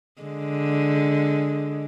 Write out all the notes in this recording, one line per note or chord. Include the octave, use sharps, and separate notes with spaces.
D3 G#3